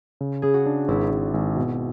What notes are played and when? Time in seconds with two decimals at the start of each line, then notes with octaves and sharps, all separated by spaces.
0.21 C#3
0.42 C#3 G#4
0.54 F#4
0.66 D4
0.88 G#1 E4
1.11 G#1
1.34 G#1
1.56 B2